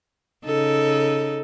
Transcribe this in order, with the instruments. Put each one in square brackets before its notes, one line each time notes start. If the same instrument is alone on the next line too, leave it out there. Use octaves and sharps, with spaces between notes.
[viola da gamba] C#3 D#4 A4